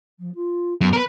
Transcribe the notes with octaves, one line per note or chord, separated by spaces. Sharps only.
F3
F4
F#2 B3
A#4 B4